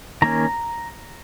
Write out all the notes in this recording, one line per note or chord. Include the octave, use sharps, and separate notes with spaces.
D#3 A#3 C#4 A#5